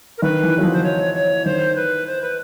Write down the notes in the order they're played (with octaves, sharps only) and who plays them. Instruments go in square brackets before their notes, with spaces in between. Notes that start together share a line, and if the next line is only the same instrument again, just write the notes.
[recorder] A#4
[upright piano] D#3 [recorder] B4
[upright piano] E3
F#3
F3
[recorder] C5
C#5
C#5
[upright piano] D#3 [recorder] C5
[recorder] B4
C5
B4